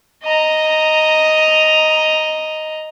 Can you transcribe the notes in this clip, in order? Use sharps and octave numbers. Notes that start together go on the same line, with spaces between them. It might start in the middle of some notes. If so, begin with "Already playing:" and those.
D#5 A#5